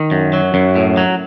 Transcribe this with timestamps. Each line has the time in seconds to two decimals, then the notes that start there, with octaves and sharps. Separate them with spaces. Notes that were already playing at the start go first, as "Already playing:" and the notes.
Already playing: D#3
0.11 F#2
0.33 F#3
0.54 F#2
0.76 A2
0.97 F#3